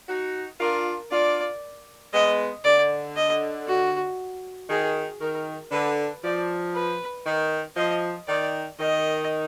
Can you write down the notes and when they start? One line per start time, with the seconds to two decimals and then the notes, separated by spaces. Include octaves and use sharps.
0.08 D#4 F#4
0.59 D4 F4 A#4
1.10 D4 F4 D5
2.13 G#3 B3 D#5
2.64 D3 D5
3.16 D#5
3.67 F#4
4.70 D#3 G#4
5.21 D#3 A#4
5.71 D3 B4
6.23 F3 D5
6.74 B4
7.25 D#3
7.77 F3 D#5
8.28 D#3 D5
8.79 D#3 D#5